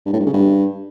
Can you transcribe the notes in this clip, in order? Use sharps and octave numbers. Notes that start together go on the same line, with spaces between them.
G2
A2
G2
C#3
G2